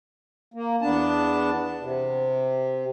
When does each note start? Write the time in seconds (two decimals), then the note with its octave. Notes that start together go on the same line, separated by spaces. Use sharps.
0.54 A#3
0.82 E2 B3 D4 A5
1.81 C3